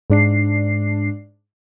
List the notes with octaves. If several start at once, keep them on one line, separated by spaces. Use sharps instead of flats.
G#2 D4 C7